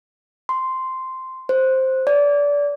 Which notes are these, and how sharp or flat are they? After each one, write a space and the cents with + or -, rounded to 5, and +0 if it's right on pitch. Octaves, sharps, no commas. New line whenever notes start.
C6 -5
C5 +5
D5 -25